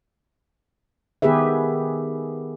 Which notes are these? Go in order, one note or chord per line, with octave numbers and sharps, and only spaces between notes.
D#3 B3 G4 G#4 B4 E5